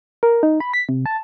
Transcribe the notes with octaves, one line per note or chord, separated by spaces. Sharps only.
A#4
D#4
B5
B6
C3
A5